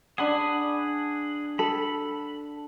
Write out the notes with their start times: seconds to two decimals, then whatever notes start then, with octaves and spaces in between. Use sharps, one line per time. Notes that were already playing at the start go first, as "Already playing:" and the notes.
0.18 D4 G#4 F#5 B5
1.59 A4 B5